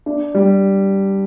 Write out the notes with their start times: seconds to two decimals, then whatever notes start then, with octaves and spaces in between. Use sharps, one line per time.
0.06 D4
0.35 G3